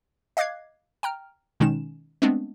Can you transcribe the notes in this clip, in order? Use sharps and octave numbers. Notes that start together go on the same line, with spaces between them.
D#5 F5 D6 F#6 G#6 C7
G5 A#5 F6
B2 D#3 G#3 C#4 D#4 E7
G#3 A3 B3 C4 D4